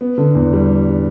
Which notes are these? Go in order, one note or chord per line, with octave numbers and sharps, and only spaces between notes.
B3
D3
E2
G3